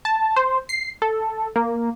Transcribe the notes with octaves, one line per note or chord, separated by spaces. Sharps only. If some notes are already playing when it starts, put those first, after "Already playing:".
A5
C5
C7
A4
A#3